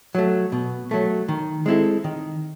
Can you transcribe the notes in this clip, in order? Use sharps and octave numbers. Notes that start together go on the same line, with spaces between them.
F#3 A3
B2
F#3 A3
D#3
G#3 C4 E4 A4
D#3